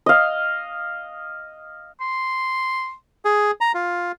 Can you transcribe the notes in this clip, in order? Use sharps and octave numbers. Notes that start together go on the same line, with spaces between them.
D#5 F5
C6
G#4
A#5
F4